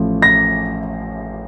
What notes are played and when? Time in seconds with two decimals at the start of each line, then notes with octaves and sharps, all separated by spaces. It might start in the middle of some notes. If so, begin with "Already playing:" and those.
Already playing: A1 A2 F3
0.22 A#6